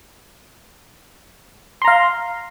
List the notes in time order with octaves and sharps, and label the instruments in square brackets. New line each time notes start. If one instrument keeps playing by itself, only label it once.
[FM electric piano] C6
A#5
F5